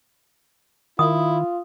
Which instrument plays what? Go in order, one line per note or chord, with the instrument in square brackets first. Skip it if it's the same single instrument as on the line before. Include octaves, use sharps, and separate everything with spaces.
[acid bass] D#3 [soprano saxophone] E4 [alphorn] F4 [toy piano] D#6